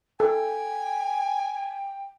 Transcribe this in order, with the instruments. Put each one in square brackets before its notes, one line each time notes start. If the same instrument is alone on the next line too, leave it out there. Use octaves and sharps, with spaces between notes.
[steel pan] A4 [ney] G5 [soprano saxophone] G#5